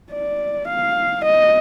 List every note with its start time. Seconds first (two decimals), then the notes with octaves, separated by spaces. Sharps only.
0.12 D5
0.68 F5
1.25 D#5